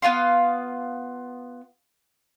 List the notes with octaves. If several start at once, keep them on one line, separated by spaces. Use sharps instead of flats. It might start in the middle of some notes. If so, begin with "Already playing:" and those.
B3 F4 F5 C6